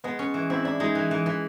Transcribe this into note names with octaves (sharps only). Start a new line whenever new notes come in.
G#3 B3
C#4
E3
C4 E4
D4 E4
G#3 D#4
E3
E3
E3